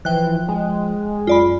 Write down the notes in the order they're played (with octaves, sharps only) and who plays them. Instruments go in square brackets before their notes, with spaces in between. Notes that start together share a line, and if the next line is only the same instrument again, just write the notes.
[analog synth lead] E3 [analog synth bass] F3 [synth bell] G5 F#6
[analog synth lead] G#3
[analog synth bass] F#2 [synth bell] F4 D5 B5